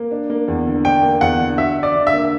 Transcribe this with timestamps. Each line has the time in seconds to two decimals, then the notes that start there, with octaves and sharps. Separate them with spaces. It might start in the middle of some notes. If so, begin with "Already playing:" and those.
Already playing: A#3
0.11 D4
0.30 A#3
0.48 E2
0.66 D3
0.85 D4 G5
1.03 A#3
1.21 E2 F#5
1.40 D3
1.58 F#4 E5
1.77 D4
1.83 D5
1.95 D3
2.07 E5
2.13 A#3